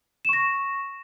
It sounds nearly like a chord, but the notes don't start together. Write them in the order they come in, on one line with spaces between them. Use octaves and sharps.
E7 C#6 A#6